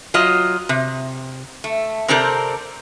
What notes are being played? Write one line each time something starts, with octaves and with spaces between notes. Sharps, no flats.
F#3 F4 D#5
C3
A3
C3 C4 G4 A4 A#4 D5